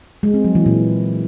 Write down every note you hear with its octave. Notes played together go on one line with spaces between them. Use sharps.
G#3
C4
F#3
E3
A#2